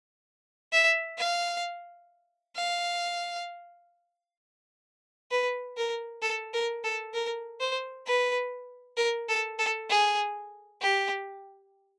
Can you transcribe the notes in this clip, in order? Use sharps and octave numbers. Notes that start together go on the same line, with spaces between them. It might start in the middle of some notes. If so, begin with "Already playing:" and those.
E5
F5
F5
B4
A#4
A4
A#4
A4
A#4
C5
B4
A#4
A4
A4
G#4
G4